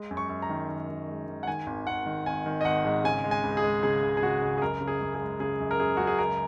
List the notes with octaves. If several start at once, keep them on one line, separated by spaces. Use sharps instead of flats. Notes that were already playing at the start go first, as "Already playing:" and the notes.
Already playing: G#3
F#2
C#6
F#2
A#5
D#3
D#3
D#3
G#3
D#3
F#5
D#3 G#5
G#1
G#1 F#5
D#3
G#1 G#5
D#3
D#5
G#1 F#5
G#2
C#3 G#5
G#3
G#5
C#2
G#4
G#3
C#3 G#4
C#2
G#4
C#3 F#4
C#2
G#4
F#2 A#4
C#3
G#4
F#2
G#4
G#3
C#3 G#4
F#2
A#4
F#2 G#4
F#2 F#4
G#4
C#2 A#4